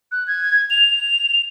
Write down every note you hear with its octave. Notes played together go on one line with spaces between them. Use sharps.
F#6
G#6
F7